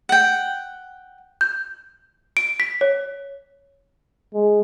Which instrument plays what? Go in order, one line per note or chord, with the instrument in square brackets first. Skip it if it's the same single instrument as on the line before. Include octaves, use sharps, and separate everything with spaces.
[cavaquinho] F#5 G5
[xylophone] G6
D7
B6
C#5
[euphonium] G#3